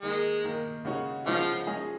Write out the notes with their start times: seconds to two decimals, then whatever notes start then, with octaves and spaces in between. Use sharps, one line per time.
0.02 D#3 G#3 A#3 D#4 A#4
0.44 D#3 A#3 D#4 A#4
0.85 C#3 G#3 D#4 F#4 C#5
1.26 C#3 F3 G#3 D#4 F#4 C#5
1.67 F3 G#3 C#4 G#4 D#5